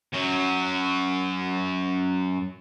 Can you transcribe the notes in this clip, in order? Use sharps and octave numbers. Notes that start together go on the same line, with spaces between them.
F#2 F#3